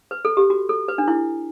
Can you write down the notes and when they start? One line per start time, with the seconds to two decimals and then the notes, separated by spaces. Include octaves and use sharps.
0.11 B4
0.25 A4
0.37 G4
0.50 F#4
0.69 A4
0.88 B4
0.98 D4
1.08 E4